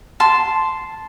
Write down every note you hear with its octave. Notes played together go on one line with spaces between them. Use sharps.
A5 C6